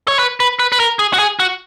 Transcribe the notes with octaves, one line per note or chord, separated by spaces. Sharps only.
C#5
B4
B4
B4
B4
A#4
G#4
F#4
G#4
F#4